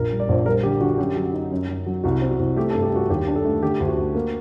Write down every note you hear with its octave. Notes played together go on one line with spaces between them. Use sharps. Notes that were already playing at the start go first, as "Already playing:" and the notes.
Already playing: A#1 A#4
G3
D5
A#1 C5
G3 A#4
D3 G4
D3 F#4
F#2 G4
F#3
D#4
F#2
F#2
F#3
C2 F#4
C4
F#4
C2
A3 G4
A4
G2
G4
G2 F#4
D#2 G4
D4
A4
A3
D3 G4
D2
F#4
A3
A#3